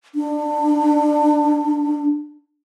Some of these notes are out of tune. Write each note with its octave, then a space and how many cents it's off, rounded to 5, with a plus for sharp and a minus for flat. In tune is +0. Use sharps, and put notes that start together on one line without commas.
D4 +25